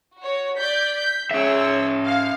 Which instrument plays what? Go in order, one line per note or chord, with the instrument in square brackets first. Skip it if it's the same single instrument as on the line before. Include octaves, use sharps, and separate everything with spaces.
[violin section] F#4 C#5
D5 G6 B6
G6 B6
[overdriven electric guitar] C#4 E5 [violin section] G#4 C#5 E6
[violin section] F5